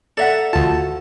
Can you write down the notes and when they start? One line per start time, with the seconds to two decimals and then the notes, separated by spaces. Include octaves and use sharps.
0.17 A4 D5 E5 F#5 A#5
0.53 D2 F4 F#4 A5